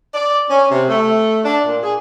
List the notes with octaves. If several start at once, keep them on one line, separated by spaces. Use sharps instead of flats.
D5
C#4
C3
A3
D4
A#2
G#4